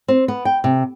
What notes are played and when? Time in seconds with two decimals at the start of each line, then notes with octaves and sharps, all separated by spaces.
0.08 C4
0.28 B3
0.45 G5
0.64 C3